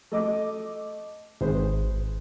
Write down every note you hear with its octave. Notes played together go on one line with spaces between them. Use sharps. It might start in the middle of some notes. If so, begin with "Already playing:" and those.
A3 D#5 D6
G#1 G#4 B4 C5